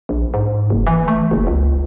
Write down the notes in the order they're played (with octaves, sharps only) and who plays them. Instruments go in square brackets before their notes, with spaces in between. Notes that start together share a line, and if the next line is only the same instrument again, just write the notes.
[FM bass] A#1
G#2
F#1
E3
A3
F#1
C#2